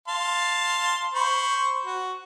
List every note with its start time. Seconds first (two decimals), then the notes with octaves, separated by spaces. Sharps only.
0.08 F5 A5 C6
1.13 C5 B5 C#6
1.86 F#4